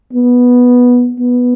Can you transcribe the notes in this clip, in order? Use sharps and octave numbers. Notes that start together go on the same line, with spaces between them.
B3
B3